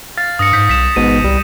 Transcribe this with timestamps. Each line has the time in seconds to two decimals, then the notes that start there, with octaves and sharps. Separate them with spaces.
0.18 F5 A6
0.39 G2 D#6 A#6 C#7
0.53 G#2 G6 B6 C#7
0.69 B1 B6 E7
0.96 A1 G#2 B2 D#7
1.24 C2 G3